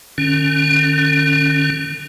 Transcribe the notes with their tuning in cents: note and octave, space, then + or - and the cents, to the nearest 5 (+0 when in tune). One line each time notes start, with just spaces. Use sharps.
D3 +45 C#4 +0